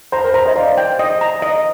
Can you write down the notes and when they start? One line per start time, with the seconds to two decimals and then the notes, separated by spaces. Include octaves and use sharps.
0.12 C5 A#5
0.24 A#4
0.34 C5 A#5
0.45 C5 D#5
0.56 C5 D5 F5
0.78 G5
0.99 D#5
1.21 A#5
1.42 D#5